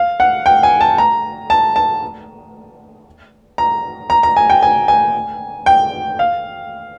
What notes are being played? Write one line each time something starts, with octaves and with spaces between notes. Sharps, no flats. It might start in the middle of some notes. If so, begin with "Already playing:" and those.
Already playing: F5
F#5
G5
G#5
A5
A#5
A5
A5
A#5
A#5
A#5
G#5
G5
G#5
G#5
G5
F5